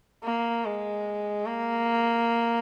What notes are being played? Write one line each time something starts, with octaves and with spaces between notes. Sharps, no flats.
A#3
G#3
A#3